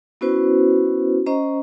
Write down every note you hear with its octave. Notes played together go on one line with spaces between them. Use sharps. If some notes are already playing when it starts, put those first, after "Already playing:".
B3 C#4 E4 F#4 B4 C5
C#4 C5 D#5 A#5